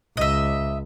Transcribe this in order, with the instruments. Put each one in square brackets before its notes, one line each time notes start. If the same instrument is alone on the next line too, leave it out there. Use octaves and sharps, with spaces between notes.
[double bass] C#2 [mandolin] D#5 E5